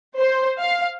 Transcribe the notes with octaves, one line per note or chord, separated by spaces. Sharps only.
C5
F5